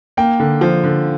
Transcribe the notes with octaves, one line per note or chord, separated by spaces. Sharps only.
A#3 G5
D3
F3
D3